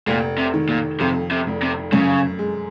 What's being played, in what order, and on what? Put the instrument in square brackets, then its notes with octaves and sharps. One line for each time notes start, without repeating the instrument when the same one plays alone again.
[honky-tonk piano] F1 [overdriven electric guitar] A#2
[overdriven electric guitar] C3
[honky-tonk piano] D#3
[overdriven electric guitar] A#2
[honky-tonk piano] F2 [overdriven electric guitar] C3
[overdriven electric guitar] C3
[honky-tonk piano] F1
[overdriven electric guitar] C3
[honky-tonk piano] F#2 [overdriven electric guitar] C#3
[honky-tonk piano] G#3